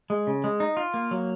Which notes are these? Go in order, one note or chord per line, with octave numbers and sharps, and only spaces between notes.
G#3
C#3
G#3
D#4
F4
A#3
F#3